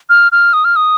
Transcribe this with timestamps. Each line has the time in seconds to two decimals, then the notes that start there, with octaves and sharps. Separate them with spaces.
0.10 F6
0.32 F6
0.53 D#6
0.65 F6
0.76 D#6